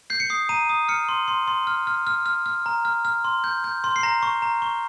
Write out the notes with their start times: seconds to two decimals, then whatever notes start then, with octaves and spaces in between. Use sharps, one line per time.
0.10 G6 C7
0.20 C#7
0.30 D#6 C7
0.49 A#5 D#7
0.69 D#6
0.88 F6 C#7
1.09 C6
1.28 C6
1.48 C6
1.67 F6
1.87 F6
2.07 F6
2.26 F6
2.46 F6
2.66 A#5
2.85 F6
3.05 F6
3.24 C6
3.44 G6
3.64 G6
3.84 C6
3.96 C7
4.03 A#5 A#6
4.23 C#6
4.42 A#5
4.62 C#6